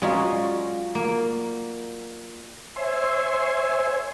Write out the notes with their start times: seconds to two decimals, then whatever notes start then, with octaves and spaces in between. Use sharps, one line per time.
0.02 F#3 G#3 C#4 F4 F#4 D5 A#5
0.95 A#3
2.76 C5 C#5 E5 G#5 C6